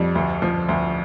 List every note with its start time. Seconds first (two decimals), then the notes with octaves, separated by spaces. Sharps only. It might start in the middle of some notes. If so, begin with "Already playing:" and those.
Already playing: F2 G3
0.15 D2
0.42 F3
0.69 D2